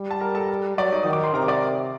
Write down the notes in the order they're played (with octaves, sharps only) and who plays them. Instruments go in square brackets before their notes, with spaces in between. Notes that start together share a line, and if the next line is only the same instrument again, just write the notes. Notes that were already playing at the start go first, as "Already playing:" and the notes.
Already playing: [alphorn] G3
[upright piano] A5
A#4 A#5
A4 A5
[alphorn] F#3 [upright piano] D5
[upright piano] D#4 D#5
[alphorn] D#3 [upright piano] D#6
[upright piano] D6
C6
[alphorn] C3 [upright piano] A#4 A#5
[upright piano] D5 D6